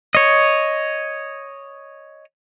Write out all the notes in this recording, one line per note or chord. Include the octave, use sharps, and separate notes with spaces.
C#5 D#5